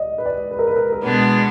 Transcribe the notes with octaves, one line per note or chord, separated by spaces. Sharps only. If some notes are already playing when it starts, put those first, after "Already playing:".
Already playing: D5 D#5
B4
D5
B4
A#4
B4
A#4
A#4
B2 G#3 B3 D4 B4